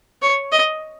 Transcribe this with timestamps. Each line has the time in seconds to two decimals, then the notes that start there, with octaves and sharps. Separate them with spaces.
0.22 C#5
0.52 D#5